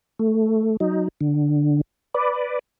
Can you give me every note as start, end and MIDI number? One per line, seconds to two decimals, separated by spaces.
0.19 0.77 57
0.80 1.08 54
0.80 1.08 63
1.21 1.81 50
2.14 2.59 71
2.14 2.59 74